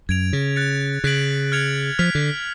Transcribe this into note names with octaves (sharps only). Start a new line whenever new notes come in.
F#2 G#6 D7 F7
C#3
F#6 A6 C#7
C#3 F#6 B6 D7 F#7
F6 G#6 C#7 F7
F3 F6 B6 F7
D3